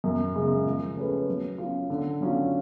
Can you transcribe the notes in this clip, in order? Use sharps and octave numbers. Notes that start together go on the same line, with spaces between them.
F#2
C#3 G#3
F3
A3 C#4 G#4 B4
F#3
C#4 F4
D3
F#3 C#4 F4